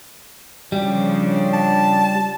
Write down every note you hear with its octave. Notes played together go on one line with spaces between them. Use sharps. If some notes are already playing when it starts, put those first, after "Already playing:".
C#3 F3 G3 D4
A5